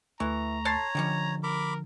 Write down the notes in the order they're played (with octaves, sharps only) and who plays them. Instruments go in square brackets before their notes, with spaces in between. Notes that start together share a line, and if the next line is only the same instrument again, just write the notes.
[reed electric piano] D2 A3 C#6 [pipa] E3 [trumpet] A#5
[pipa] A4 A5 C6 [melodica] C#5
[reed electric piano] D3 F3 [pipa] D#3 G3 C#4
[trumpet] A#4 [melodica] B5 D6